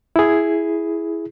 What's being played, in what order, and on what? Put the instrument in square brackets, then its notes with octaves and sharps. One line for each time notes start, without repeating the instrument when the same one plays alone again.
[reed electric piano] E4 G#4